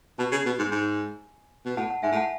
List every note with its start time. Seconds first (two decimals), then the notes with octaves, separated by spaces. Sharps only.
0.19 B2 A5 C#6
0.32 C#3
0.46 B2
0.59 G#2
0.71 G#2 G#5 B5
1.66 B2
1.77 A2 F#5 A5
1.90 F#5 A5
2.03 G#2 E5 G#5
2.12 A2
2.16 F#5 A5